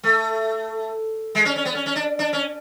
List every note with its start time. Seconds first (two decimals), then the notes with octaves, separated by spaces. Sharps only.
0.03 A3
1.35 G#3
1.45 C#4
1.56 C#4
1.65 B3
1.75 C#4
1.86 C#4
1.95 D4
2.19 D4
2.33 C#4